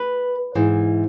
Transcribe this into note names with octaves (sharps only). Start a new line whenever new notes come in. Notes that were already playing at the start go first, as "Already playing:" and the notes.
Already playing: B4
G#2 E3